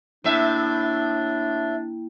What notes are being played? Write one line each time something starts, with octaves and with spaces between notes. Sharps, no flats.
A2 A#3 D4 E4 E5 G5